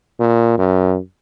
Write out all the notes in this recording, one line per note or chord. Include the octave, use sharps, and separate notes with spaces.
A#2
F#2